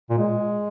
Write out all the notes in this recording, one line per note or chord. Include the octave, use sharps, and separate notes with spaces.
A#2
G#3